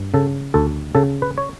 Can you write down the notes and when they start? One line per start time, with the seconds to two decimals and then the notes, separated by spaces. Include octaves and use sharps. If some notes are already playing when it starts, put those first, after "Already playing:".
Already playing: G2
0.14 C#3 A4
0.54 D2 A4
0.95 C#3 A4
1.22 B4
1.38 C#5